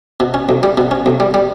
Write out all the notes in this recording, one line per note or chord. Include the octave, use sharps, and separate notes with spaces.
B2
C#4
B1
G3
B2
C#4
B1
G3
G3